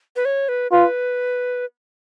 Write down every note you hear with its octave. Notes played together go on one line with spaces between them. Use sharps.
B4
C#5
B4
F4 B4